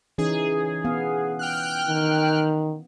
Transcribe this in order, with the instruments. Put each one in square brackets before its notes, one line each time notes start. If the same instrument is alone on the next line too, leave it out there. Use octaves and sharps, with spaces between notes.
[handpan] E3 C#4 D#4 [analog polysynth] G#4
[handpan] B3 F5
[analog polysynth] G5 F6 F#6
[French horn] D#3